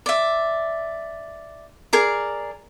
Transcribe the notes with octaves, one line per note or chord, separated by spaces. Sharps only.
D5 E5
G#4 A#4 D5